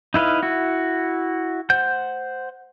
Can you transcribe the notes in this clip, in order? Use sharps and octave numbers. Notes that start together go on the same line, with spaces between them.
D#4 E4 B4 D#5 F5
E4 F#4
C5 F#5 G6